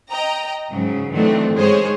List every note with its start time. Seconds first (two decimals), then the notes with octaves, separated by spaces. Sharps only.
0.10 D#5 G5 A#5
0.71 G#2 C#3 F#3
1.13 D#3 E3 F#3 A3 C4 D4
1.54 G#2 D#3 G#3 G#4 C5 C#5